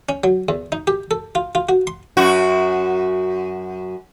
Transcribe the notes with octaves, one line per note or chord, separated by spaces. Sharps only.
C#4
F#3
E2
D#4
G4
A4
F4
F4
F#4
C6
F#2 F#4